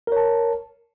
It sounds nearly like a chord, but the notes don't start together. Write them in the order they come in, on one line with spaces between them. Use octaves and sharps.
A#4 C#5 A5